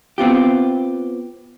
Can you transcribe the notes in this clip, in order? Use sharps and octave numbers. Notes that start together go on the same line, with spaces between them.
B3 C4 F4 G4